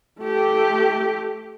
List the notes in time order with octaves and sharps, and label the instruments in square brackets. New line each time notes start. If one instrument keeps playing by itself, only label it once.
[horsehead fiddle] A3 G4